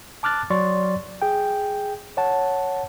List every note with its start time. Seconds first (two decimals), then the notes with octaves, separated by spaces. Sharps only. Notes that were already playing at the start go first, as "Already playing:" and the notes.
0.23 A5 D6 F6 F#6 A6
0.50 F#3 D5 C6 C#6 A6
1.22 G#4 G5
2.17 C#5 F#5 A5